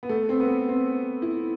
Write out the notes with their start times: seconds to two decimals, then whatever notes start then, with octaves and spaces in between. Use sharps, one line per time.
0.03 B3
0.09 A3
0.29 C4
0.40 B3
0.69 C4
1.22 E4